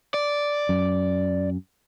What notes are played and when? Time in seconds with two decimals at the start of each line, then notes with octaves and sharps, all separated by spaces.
0.14 D5
0.69 F#2